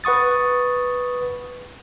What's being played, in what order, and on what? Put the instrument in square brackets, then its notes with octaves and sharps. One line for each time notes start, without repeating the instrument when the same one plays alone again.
[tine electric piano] B4 F#5 C#6 D#6 A6